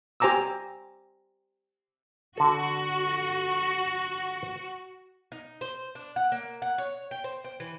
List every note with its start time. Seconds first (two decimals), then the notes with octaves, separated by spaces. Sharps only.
0.20 G4 C5 G#5 A#5 D6 E6
2.37 D3 F#4 A4
5.32 D#4
5.61 C5
5.95 D4
6.16 F#5
6.32 A#3
6.62 F#5
6.78 C#5
7.11 G5
7.24 C5
7.44 G5
7.60 E3